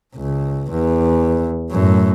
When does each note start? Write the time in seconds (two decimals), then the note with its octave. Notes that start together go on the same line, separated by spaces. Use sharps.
0.15 C#2
0.70 E2
1.71 F#2 A2